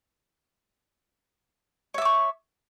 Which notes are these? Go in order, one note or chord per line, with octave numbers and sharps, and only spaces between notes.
C#5 E5 C#6 D6